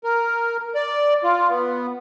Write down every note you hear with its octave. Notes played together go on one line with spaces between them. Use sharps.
A#4
D5
F4
B3